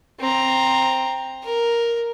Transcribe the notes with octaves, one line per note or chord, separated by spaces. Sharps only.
C4 A#5
A#4